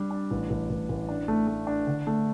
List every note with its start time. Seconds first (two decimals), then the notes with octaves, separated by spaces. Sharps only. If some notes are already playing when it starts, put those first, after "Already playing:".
Already playing: G3 D4 G4
0.11 D4
0.31 A1
0.50 A1
0.70 A1
0.89 A1
1.09 D4
1.28 A3
1.47 A3
1.67 D4
1.87 D3
2.07 A3